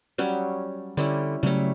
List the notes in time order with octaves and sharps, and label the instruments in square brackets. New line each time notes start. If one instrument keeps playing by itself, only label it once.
[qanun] F#3 G3 C#4
[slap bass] D3 [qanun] G3 C#4 E4
[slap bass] C#3 F#3 A3 [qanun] G3 C#4